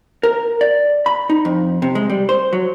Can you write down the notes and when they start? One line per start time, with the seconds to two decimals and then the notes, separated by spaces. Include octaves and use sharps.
0.23 A#4
0.61 D5
1.06 B5
1.30 D#4
1.45 F2
1.82 C3
1.95 G#3
2.10 G3
2.29 C5
2.53 F#3